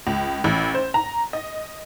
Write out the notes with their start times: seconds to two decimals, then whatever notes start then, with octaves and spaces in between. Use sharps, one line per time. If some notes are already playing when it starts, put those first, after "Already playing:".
0.07 C#2
0.44 A1
0.74 C5
0.94 A#5
1.33 D#5